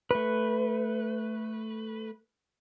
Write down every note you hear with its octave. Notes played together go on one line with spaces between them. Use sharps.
A3 B4